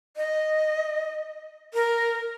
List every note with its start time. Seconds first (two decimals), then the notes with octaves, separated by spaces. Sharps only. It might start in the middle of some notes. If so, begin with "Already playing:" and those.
0.17 D#5
1.74 A#4